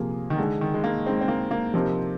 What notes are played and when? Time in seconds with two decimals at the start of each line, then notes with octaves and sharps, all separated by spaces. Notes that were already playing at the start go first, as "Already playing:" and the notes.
Already playing: C3 F3 A#3 F4 G#4
0.30 D#3
0.38 D3 G#3 D#4 G#4
0.61 D#3
0.74 G#3
0.84 A#3
1.06 G#3 C4 D#4 G#4
1.21 C4
1.28 A#3
1.51 A#3
1.74 C3 F3 C4 D#4 A#4